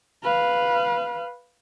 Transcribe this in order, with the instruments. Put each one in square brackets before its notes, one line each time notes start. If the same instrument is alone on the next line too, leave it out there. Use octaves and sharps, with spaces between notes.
[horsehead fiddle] B4 F5